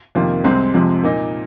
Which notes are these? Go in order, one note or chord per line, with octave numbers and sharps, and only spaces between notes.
F2 C3 D#3 A#3 F4
C2 C3 G#3 C4
F2 C3 F3 G#3
A#2 A#3 D#4